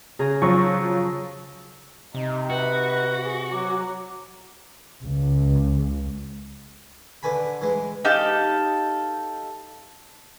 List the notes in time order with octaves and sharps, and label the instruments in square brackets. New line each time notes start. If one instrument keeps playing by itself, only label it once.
[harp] C#3 G#4 A#5
[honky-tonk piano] F3 F#3 [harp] C#6
[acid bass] C3 [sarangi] D#4
[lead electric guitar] F#4 [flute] B4
[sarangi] G#4
[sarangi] F#3 [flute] D6
[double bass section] C#2
[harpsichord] D3 B4 G#5 B5
E3 G#3
[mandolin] D#4 G4 A4 F5